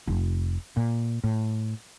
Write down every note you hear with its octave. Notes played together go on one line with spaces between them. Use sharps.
F1
A#2
A2